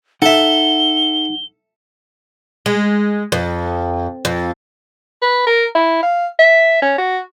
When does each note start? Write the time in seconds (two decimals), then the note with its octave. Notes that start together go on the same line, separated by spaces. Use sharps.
0.22 D#4 A4 E5 F#5 G7
2.66 G#3
3.32 F2
4.25 F2
5.22 B4
5.47 A#4
5.75 E4
6.03 F5
6.39 E5
6.82 C#4
6.98 F#4